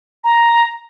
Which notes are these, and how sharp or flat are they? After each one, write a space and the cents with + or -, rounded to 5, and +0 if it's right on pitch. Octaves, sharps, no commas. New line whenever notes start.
A#5 +5